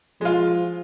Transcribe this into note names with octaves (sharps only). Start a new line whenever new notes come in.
F3 G#3 F4